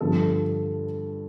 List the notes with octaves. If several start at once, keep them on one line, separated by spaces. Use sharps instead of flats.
G2 D3 F3 A4